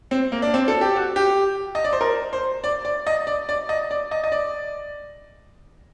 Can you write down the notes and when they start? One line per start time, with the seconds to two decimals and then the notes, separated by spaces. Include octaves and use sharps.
0.11 C4
0.32 A#3
0.42 D4
0.54 C4
0.68 A4
0.81 G4
0.96 F#4
1.16 G4
1.75 D#5
1.84 D5
1.93 C5
2.01 A#4
2.33 C5
2.64 D5
2.85 D5
3.07 D#5
3.27 D5
3.49 D5
3.69 D#5
3.91 D5
4.11 D#5
4.24 D#5
4.32 D5